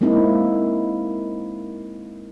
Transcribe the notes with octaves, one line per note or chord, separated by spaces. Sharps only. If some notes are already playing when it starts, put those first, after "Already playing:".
G#3 A#3 C4 D#4 E4